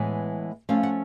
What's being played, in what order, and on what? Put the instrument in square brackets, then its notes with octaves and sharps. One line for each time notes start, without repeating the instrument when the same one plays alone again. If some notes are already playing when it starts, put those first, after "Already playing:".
Already playing: [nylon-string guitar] A2 E3 G#3 B3
F3 A3 C#4 F5
F#5